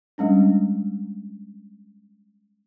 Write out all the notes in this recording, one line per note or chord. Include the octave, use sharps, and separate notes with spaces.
G3 G#3 C#4 D4